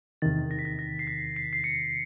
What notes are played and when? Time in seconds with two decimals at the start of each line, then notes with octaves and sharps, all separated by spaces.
0.22 E2 C3 D#3 A6
0.51 A#6
0.59 B6
0.65 A#6
0.79 A#6
0.99 C7
1.07 B6
1.36 C7
1.53 C7
1.64 C#7